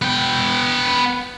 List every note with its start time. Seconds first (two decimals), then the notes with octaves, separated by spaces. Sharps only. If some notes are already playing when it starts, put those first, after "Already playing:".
0.02 B3 G5